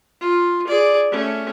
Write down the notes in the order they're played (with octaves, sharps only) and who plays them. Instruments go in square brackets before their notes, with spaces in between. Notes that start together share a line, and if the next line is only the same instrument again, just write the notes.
[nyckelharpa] F4
G#4 D5
A3 C#4